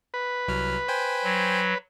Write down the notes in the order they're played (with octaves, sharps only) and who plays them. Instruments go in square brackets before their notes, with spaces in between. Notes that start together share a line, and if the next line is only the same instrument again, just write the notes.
[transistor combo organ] B4
[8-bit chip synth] C2 F#3 F6
C5 G5 G#5
[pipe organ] F#3